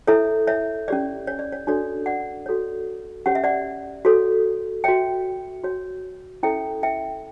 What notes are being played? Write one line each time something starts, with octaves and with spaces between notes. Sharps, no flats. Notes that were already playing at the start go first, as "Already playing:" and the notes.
E4 A4 C#5 E5
C#5 E5
C#4 G4 C#5 D5
C#5
D5
C#5
D4 F#4 A4 C#5 D5
D5 F#5
F#4 A4 C#5
C#4 G4 C#5 F#5
E5
D5 F#5
F#4 A4 C#5
F#4 C#5 E5 G5
F#4 C#5
C#4 E4 A4 C#5 E5 G5
E5 G5